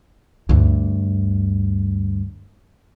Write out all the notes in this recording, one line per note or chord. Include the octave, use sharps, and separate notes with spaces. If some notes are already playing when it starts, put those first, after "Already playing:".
D2 G2